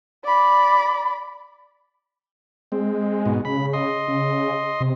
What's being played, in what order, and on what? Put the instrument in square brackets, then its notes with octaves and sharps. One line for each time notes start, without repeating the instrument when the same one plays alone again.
[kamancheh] D5 B5
[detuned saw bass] G#3 [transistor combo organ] C4
[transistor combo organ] G#2 B2
[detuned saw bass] C#3 [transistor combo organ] B5
[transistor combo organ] D#5 C6
[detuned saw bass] C#3
C3